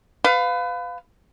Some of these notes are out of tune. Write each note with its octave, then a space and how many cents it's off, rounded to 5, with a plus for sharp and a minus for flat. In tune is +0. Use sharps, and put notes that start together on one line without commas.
B4 +30 F5 +15